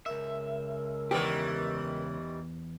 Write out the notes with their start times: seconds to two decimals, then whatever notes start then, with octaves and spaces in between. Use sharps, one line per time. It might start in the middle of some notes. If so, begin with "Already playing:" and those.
0.06 C#2 A#4 E5
1.11 E2 D#3 E3 G3 G4